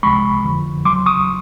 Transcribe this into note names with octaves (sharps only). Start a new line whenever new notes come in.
C2 C3 F3 G#3 B5 C#6
F2 D3 F3
E2 C#3 F#3 C6 D6
C#6 D#6